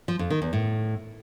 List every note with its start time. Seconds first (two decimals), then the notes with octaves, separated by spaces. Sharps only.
0.08 F3
0.19 F2
0.30 D#3
0.42 E2
0.53 A2